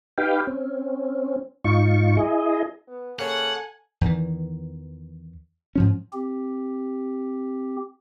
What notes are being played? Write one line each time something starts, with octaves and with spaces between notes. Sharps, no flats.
D#4 G4 B4 F5 G5
C4 C#4
G#2 D#4 F4 C#6
E4 G#4 D#5
B3
C#3 A#3 A4 C#5 F#5 G#5
E2 D#3 E3
G#2 F3 C#4
C4 G4